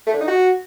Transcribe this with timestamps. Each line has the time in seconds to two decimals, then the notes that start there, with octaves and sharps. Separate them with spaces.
0.07 A3
0.14 D3
0.21 D#4
0.28 F#4